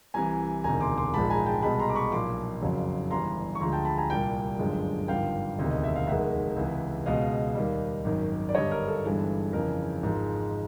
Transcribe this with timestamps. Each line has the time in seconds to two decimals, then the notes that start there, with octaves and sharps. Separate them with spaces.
0.14 C2 C3 E3 G#5 A#5
0.64 E1 D2 C3 D#3 G#5 A#5
0.80 C6 D6
0.98 C6 D6
1.14 A#1 G#2 F3 G#3 A5 B5
1.30 G#5 A#5
1.46 G5 A5
1.62 C2 B2 G#3 A5 B5
1.79 A#5 C6
1.89 D6
1.95 B5 C#6
2.12 B1 A#2 F3 C6 D6
2.62 F#1 F2 C#3 F#3
3.11 G1 G2 E3 G3 A#5 C6
3.55 C#6
3.60 D2 D3 F3 G#3 A#5 C6
3.72 G5 A5
3.85 A5 B5
3.98 G#5 A#5
4.10 C2 A#2 G3 G5 A5
4.59 G1 F#2 D3 F3 G#3
5.08 G#1 G2 D3 F3 F5 G5
5.58 E1 D2 C3 D#3
5.71 D#5
5.84 E5
5.96 F5
6.07 F1 D#2 D#3 G#3 E5 F#5
6.56 C#2 C3 E3
7.06 C#2 B2 G#3 D#5 F5
7.55 D#2 D#3 G3
8.04 G#1 F#2 D#3
8.49 D5
8.54 G1 G2 D3 G3 C#5 D#5
8.71 A#4
8.87 A4
9.04 G1 G2 E3 G#3
9.53 F2 C#3 E3 A#4
10.03 G#1 G#2 F3 G#3